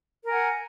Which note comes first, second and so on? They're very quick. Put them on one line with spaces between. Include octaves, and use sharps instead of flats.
A#4 G#5 F#5